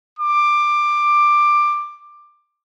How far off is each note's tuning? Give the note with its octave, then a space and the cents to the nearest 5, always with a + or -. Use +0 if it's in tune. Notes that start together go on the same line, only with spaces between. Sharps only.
D6 +15